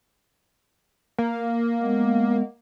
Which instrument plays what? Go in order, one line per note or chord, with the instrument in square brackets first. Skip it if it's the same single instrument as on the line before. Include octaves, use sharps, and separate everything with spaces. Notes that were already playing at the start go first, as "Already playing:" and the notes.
[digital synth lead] A#3
[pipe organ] G#3 B3